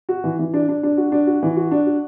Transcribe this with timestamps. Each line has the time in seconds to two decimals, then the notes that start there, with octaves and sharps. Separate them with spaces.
0.09 F#4
0.24 E3
0.39 E3
0.54 D4
0.69 D4
0.83 D4
0.97 F#4
1.12 D4
1.27 F#4
1.43 E3
1.56 F#4
1.71 D4
1.87 F#4